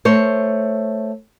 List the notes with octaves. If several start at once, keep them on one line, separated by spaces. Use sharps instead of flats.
A3 C5 C#5